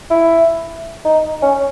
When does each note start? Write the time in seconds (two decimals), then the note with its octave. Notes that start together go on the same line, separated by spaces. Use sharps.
0.10 E4
1.05 D#4
1.42 C#4